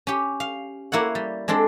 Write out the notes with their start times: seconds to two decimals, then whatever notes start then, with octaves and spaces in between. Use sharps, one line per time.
0.07 C#4 G4
0.40 F5
0.92 A#3 E4 C#5 F#5
1.15 G3
1.48 G#3 C4 D4 A4